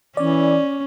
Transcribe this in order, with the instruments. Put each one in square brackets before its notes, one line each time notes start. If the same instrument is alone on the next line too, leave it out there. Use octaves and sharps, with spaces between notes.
[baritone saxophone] E3 [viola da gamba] C#4 [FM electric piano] D5